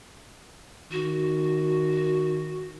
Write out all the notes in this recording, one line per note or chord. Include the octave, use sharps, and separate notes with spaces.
D#3 F#4